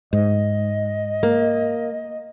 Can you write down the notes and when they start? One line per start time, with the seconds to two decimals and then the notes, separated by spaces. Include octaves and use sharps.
0.13 G#2 D#5
1.23 A#3